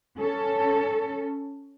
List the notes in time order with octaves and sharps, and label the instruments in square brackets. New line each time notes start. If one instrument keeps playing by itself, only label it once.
[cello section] C#4 A4